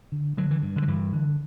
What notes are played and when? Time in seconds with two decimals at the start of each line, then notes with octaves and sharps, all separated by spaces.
0.12 D3
0.37 D3 F#3
0.51 E3
0.62 G2
0.76 D3
0.82 F#3
0.88 G2 E3
1.13 D3